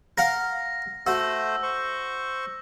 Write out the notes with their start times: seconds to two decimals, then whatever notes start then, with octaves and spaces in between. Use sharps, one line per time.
0.18 A#4 F5 F#5 A#6
1.07 A3 F#4 C5 E6
1.63 C5 C#6